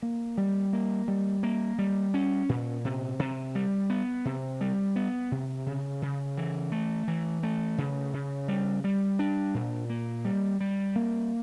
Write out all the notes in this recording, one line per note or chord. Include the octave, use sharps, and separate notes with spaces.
A#3
G3
A#3
G3
A#3
G3
C#4
A#2
C3
C3
G3
B3
C3
G3
B3
C3
C#3
C#3
E3
A3
E3
A3
C#3
C#3
G3
G3
D4
A#2
A#3
G3
G3
A#3